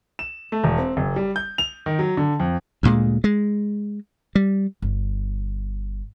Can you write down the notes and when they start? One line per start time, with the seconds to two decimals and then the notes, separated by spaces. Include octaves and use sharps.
0.19 E7
0.52 A3
0.64 E1
0.78 C4
0.97 F#1
1.16 G3
1.36 G6
1.58 F7
1.86 D#3
1.99 F#3
2.17 D3
2.40 F2
2.83 D2 A#2 G#3
3.24 G#3
4.35 G3
4.82 G1